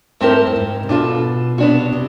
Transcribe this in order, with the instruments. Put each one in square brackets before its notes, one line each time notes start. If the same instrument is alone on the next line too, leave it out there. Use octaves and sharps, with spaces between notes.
[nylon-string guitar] G#2 [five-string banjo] A3 C4 E4 G4 A#4
[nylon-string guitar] G2
G#2
C3
[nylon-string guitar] B2 [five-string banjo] D4 F4 A4
[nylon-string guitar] C3 [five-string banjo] B3 D4 F#4
[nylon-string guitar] C3